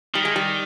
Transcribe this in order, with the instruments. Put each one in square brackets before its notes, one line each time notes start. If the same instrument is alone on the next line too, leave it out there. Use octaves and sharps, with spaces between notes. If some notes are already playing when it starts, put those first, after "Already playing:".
[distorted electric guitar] D#3 [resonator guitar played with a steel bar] G3
[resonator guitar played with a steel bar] G#3
G3